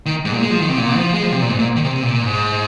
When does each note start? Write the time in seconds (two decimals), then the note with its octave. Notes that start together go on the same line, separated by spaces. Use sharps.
0.06 D#3
0.25 G#2
0.33 A#2
0.42 G#3
0.51 F3
0.60 D#3
0.69 C3
0.78 A#2
0.96 F3
1.14 G#3
1.23 F3
1.31 C3
1.41 A#2
1.49 G#2
1.59 A#2
1.76 D#3
1.85 C3
2.03 A#2
2.21 G#2